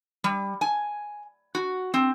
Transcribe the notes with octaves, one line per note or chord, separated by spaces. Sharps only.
G3
G#5
F#4
C4